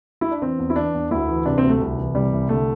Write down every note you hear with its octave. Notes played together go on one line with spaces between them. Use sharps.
E4
D4
E3 C4
E2
E4
E3 D4
E2
D2 E4
E3
C3 D4
D2 C4
A3
C2
E3
C3 G3
C2
D3 A3